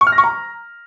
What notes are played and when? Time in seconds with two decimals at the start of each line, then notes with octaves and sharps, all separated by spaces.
0.01 C#6
0.07 F6
0.12 A#6
0.18 C#6
0.24 A#5